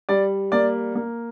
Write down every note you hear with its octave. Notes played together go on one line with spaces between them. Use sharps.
G3 D5
A#3 D5
A#3